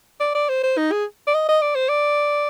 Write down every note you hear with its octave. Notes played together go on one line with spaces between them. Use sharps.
D5
D5
C5
C5
D#4
G#4
D5
D#5
D#5
D5
C5
D5